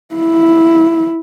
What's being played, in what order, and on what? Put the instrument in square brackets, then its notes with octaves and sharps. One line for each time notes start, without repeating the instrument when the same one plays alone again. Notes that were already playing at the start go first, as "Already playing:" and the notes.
[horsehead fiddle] E4